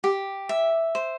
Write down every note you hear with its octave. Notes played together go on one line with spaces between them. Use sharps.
G4
E5
C5